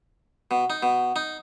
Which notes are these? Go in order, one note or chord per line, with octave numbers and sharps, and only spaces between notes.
B2
D#4
B2
D#4